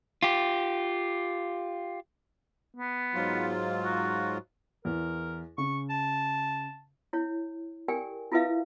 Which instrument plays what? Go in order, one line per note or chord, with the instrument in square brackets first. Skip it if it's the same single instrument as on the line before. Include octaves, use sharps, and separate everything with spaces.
[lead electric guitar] F4 G4
[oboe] B3
[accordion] G#2 F#3 F4
[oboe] F#4
[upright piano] E2 [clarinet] A#4
[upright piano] C#3 [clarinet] C#6
[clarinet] A5
[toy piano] E4 C#5
G4 A4 A#4 D5 G5 G#5
E4 F4 A4 B4 E5 F5